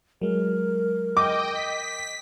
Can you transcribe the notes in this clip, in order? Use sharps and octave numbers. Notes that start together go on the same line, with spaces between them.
F#3 G#3 A#4
D#5 G5 D6
B6